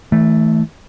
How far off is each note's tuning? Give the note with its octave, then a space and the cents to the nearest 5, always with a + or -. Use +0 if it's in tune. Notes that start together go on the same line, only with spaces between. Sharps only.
E3 -35 A3 +0